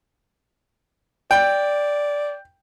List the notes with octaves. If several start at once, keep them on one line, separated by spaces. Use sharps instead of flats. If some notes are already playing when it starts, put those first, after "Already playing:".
D5 G5